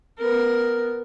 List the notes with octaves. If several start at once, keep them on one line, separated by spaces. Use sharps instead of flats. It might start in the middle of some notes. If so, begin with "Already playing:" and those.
B3 A#4